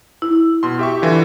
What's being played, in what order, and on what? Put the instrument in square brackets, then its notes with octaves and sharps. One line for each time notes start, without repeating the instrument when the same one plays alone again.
[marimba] E4
[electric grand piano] B2 C6
G4 E5 C#6
D3 E3 F4